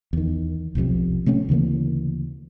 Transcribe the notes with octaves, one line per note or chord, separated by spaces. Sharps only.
E2 D#3
F1 B1 F2 C3
C3 A3 C4 C#4
D2 C#3 E3 A#3